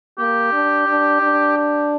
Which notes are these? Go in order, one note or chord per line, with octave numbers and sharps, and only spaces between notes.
A#3 G4
D4
D4
D4
G4